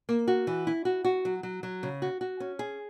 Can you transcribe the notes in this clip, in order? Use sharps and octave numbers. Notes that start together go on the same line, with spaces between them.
A#3
F#4
E3
E4
F#4
F#4
F#3
F#3
F#3
C#3
F#4
F#4
C#4
G#4